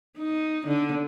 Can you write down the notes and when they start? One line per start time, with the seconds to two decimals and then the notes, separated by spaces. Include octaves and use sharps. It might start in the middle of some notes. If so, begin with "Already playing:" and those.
0.17 D#4
0.67 D3